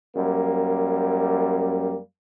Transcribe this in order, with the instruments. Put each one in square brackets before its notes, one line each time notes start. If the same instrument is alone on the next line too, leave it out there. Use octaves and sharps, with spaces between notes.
[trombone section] F#2 G3 A#3